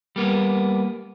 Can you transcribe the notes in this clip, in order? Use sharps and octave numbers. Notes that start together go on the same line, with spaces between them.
G3 A#3 B3